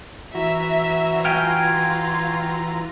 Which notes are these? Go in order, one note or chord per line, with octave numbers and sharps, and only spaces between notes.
E3 F#4 E5 A#5
F4 F5 G5 G#5